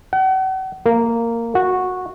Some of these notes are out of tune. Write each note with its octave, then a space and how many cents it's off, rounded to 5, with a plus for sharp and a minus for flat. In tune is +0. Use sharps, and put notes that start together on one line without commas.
F#5 +40
A#3 -10
F#4 -10